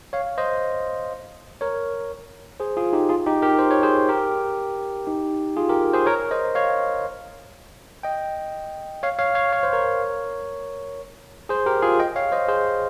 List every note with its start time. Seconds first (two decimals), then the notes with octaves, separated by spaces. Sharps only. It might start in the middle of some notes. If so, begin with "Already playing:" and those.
0.13 C#5 F5
0.38 C5 D#5
1.61 A#4 C#5
2.60 G#4 C5
2.77 F4 G#4
2.93 D#4 G4
3.09 F4 G#4
3.26 D#4 G4
3.42 G4 A#4
3.59 C5
3.71 C#5
3.83 G#4 C5
4.09 G4 A#4
5.07 D#4 G4
5.57 F4 G#4
5.69 G4 A#4
5.93 G#4 C5
6.06 A#4 C#5
6.31 C5 D#5
6.55 C#5 F5
8.03 D#5 G5
9.03 C#5 F5
9.19 C#5 F5
9.35 C#5 F5
9.53 C#5
9.63 C5
9.73 A#4 C#5
11.49 G#4 C5
11.66 G4 A#4
11.82 F4 G#4
12.00 D#5 G5
12.16 C#5 F5
12.32 C5 D#5
12.48 G#4 C5